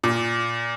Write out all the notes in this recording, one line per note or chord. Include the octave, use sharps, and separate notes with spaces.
A#2